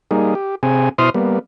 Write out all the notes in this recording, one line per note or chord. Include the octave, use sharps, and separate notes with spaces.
G3 A#3 D#4 G#4
G4
C3 C4 G#4 G#5
B2 E4 C5 C6 D#6 F6
G3 A#3 B3